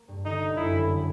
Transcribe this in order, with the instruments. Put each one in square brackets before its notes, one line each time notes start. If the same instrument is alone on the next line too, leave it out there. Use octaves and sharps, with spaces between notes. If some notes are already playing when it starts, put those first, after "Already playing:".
Already playing: [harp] A#3
G2
[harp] D3 [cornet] D#4
[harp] G1
[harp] F#2 [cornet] E4
[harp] G1
D3